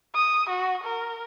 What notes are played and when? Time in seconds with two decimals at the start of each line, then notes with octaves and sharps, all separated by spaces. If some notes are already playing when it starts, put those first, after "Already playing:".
0.15 D#6
0.49 F#4
0.84 A#4